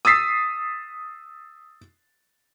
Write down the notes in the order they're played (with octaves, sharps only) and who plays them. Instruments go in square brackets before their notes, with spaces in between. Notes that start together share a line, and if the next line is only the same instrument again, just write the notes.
[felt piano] D#6 E6 A6 B6 C7